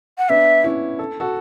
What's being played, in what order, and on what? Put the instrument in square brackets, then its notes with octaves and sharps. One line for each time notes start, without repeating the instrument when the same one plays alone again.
[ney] F#5
[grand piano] B3 D4 [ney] E5
[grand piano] C#4 E4
A4
F#4 A4